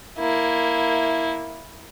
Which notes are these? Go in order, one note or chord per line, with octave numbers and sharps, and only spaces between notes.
A#3 E4